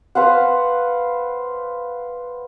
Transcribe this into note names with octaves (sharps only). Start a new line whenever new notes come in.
B4 C5 F5 F#5